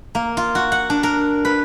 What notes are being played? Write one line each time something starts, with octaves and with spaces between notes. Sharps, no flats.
A#3
F4
F#4
F#5
D4
A#4
B4